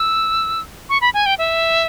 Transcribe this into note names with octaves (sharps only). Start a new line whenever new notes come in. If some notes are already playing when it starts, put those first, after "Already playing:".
Already playing: E6
C#6
B5
G#5
G5
E5